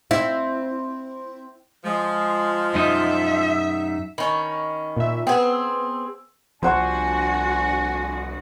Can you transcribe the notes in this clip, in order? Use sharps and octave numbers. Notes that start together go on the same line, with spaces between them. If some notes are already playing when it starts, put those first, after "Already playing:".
C4 E4
F3 G#3
F#2 D#4 E5
D#3 C#4 B5 C#6
A#2 E5
B3 C4 G#4 B4 F#5 G5
E6
C2 F3 D4 F#4 C5 F#5 G#5 C#6